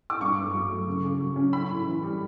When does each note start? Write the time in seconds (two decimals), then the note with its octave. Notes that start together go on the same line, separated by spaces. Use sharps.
0.10 D6
0.21 G2 C#6
0.37 G2
0.54 F#3
0.71 A3
0.87 C#3
1.04 C#3
1.20 F#3
1.36 C#4
1.53 C#4 B5
1.70 A2
1.86 E3
2.03 G3